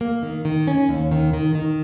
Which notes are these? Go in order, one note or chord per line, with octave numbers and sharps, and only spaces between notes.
A#3
D#3
D#3
C#4
D#2
D#3
D#3
D#3